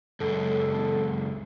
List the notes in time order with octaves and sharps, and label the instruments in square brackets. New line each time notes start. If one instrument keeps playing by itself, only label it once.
[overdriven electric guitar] C#2 F#2 [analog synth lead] A4